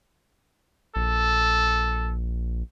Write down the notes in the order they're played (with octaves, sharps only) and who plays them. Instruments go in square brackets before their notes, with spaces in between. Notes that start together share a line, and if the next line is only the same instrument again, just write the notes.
[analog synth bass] A#1 [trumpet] A4